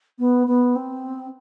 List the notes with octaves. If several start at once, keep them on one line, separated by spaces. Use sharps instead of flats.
B3
B3
C4